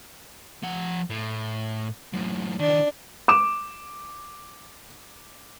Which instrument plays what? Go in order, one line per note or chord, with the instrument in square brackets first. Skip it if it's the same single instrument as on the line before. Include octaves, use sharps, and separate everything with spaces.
[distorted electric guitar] F3 F#5
A2
F#2 A2
[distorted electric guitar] D#3 E3 [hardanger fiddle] D4
[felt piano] D6 E7